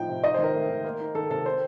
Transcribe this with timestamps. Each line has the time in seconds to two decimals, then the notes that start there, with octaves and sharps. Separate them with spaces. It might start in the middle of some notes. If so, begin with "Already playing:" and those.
Already playing: A2 F3 D#4 G5
0.08 C3
0.24 D#4 D#5
0.34 D#3 C5
0.44 A#4
0.54 A3
0.70 D#3
0.84 A#3
1.00 D#4
1.15 D#3 A4
1.30 C3 A4
1.45 C4 C5